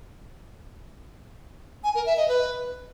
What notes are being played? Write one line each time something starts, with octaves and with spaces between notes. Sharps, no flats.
G#5
A#4
E5
D#5
B4